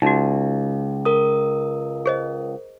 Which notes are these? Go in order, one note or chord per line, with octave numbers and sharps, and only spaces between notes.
C#2 D#4 F#4
A#4 D#6
G#4 C5 D#5